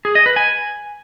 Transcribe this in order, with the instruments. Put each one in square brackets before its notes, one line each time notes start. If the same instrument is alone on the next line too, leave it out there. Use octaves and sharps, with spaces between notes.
[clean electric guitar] G#4
D#5
B4
G#5